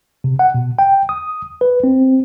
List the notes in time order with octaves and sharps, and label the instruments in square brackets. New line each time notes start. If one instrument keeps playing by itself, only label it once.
[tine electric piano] C3
F#5
B2
G5
D#6
B4
C4